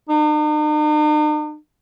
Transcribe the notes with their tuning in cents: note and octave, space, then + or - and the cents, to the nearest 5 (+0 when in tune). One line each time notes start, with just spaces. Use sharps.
D#4 -45